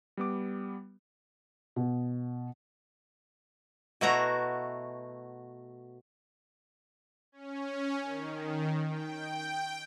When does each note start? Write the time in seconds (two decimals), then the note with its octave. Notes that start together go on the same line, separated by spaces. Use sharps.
0.17 G3 B3 D6
1.76 B2
4.01 B2 A3 E4 F#4 A#5
7.32 C#4
8.01 D#3
8.86 G5